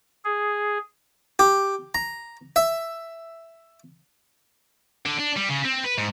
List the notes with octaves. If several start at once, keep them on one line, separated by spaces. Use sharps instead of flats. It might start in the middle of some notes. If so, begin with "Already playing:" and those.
G#4
G4
A#5
E5
D3
D4
G3
C#3
C4
B4
G#2